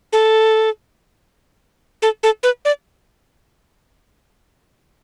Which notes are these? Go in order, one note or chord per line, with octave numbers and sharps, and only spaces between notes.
A4
A4
A4
B4
D5